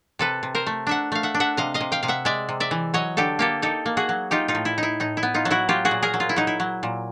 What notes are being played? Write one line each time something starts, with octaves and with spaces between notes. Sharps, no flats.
C3 A4 B4
C3
A#4 C5
A3
D4 E5 F#5
A3 F5
E5 F#5
D4
E5 F#5
C3 D#5 F5
D#5 F5
C3
F5 G5
C3 F5
E5 F#5
G#3 D5 E5
C3
D5 E5
E3
F#3 C#5 D#5
D3 G4 A4
A#3 G4 A4
D#4 G4 A4
A#3
F#4 G#4
F#3
D#4 F4 G4
D#4 F4
A2
E4
D#4
E4
A2 D#4
E4
B3
D#4 F4
F#3
E4 F#4
F#3 F4 G4
F#4 G#4
A#2
G#4 A#4
F#3
F4
E4
F#3 D#4
E4
F#3
A#2